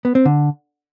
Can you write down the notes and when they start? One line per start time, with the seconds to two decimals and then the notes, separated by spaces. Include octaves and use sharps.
0.05 B3
0.15 C4
0.25 D3